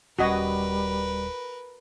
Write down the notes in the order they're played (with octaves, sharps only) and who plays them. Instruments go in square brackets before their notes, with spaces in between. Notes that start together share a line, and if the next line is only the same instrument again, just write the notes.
[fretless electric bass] D#1 C#4 [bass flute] G3 [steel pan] F#4 D#5 [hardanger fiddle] A#4 B4